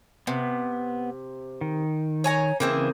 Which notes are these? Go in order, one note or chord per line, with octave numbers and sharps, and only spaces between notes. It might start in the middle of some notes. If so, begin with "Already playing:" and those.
C3 B3
D#3
C#5 G#5 A#5
C#3 E3 A#3 C4 G#4 E5